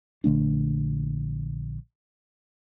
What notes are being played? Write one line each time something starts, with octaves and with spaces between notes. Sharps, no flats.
A#1 D3 A3 D4